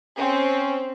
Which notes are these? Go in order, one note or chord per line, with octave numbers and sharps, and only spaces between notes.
C4 C#4